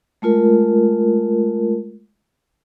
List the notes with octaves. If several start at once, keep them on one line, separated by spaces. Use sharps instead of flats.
G#3 A3 F4 A#4